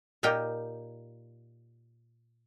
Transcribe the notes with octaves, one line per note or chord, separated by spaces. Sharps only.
A#2 D#4 G4 A#4 G5